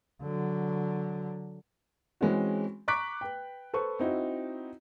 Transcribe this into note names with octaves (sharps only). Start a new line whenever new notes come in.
D3 F#3
E3 G#3 C4 C#4 F#4
A#5 C#6 D6 F#6 B6 D7
B4 G5
A4 B4 C5 C#6
C4 D#4 E4 F#4